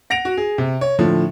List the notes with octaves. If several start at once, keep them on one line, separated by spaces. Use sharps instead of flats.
F#5 A#6 D7 F7
F#4
G#4
C3
C#5
A2 D3 F3